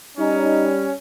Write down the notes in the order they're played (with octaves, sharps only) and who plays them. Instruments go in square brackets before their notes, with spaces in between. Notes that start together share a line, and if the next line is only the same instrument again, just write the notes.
[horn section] G3 C#4 [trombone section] D#4